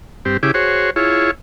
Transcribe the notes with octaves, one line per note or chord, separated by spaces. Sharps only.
G2 C4 G4
C#3 E4 G4 G#4 D6
F#4 G#4 C5 C#5
E4 F4 G#4 C#5